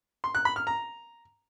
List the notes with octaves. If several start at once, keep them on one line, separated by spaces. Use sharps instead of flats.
C6
F#6
B5
F6
A#5